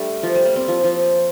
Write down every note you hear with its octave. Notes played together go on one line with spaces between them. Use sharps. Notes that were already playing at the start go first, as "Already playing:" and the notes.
Already playing: G3 A3 D4
F3
G3
A#3
C4
F3
F3